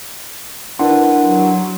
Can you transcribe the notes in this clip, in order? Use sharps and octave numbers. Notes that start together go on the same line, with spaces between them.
D4 E4 A#4 B4 F#5 C6
F#3